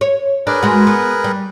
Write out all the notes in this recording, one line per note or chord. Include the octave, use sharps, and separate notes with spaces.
C#5
D4 G#4 A#4 B4
G#3 F#4
B3
G3